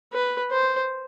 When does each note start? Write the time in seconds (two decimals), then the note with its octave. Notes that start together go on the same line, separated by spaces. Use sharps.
0.13 B4
0.52 C5